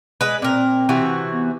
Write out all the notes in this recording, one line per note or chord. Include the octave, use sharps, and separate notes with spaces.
G#3 B4
A#2 C4 A#4
C3 E3 F#4
B3